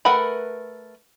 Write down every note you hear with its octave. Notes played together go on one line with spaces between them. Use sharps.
A3 A#4 B4 F#5 B5